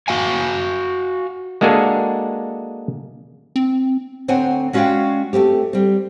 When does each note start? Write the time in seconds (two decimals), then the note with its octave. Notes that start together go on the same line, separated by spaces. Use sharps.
0.08 F#4 F5 G#5
1.61 G#3 A#3 D4 F#4 G#4 A4
3.56 C4
4.28 D2 C4 C5 C#5 F#5 G#5
4.73 G#3 C#4 F#4 D5 F5 G5
5.33 A3 A#3 C4 G4
5.73 G3 C4